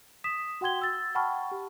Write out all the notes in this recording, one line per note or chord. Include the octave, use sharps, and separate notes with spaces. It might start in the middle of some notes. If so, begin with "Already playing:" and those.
D#6 B6 E7
F#4 F#5 G5 C6 G#6 G7
E6 A6
F#5 G5 A5 B5 C#6 F6
G4